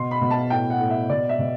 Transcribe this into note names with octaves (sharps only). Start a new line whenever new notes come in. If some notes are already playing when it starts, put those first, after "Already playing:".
Already playing: B2 C6
B5
B2
A5
A2 G5
F#5
A2
E5
B2 D5
E5
B2